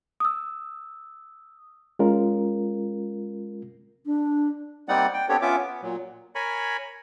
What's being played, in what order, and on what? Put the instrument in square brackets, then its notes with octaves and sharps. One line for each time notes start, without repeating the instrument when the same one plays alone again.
[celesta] D#6 E6
[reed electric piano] G#3 C#4 F4 A#4
[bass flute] D4
[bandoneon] G3 A#3 C4 D#4 D5 F#5
G5
B3 C4 D4 G4 A4 C#5
B3 C#4 F4 E5 D6
B3
A#2 F#3
[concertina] A#4 C#5 G#5 B5